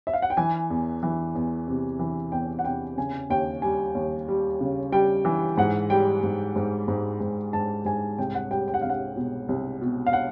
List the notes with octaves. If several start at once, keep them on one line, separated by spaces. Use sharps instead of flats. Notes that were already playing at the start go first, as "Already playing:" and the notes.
E5
F5
F#5
G5
E3 G#5
E2
E3
E2
C3
E3
E2 G5
F#5
C3 G5
C#3 G#5
D#2 G5
G3 G#5
D#2
G3
C#3
G3 G5
E3
G#2 F#5
G3 G5
G#2
G#2
G#2
G#2
G#2 A5
G#2 G#5
C2 G5
F#5
G3 G5
G5
F#5
C2 F5
F#5
B2
C2
B2
F5
F#5